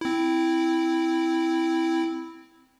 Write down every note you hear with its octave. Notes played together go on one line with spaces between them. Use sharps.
C4 E4